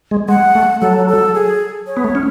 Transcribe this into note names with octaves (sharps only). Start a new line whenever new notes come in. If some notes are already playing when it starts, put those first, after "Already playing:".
G#3
G#3 F#5
A3
F#3 A4
A4
G#4
C#5
B3
A3
C#4